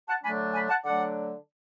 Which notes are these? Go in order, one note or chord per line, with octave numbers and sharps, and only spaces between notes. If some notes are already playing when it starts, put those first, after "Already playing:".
F#5 A5
D3 F#3 A3 D4 G#5 B5
G#5 B5
F#5 A5
D3 F#3 A3 D4 D5 F#5